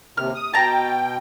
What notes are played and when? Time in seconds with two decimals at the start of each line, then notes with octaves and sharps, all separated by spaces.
0.17 D#2 C3 F6
0.35 D#6
0.54 B2 G5 A5 A#5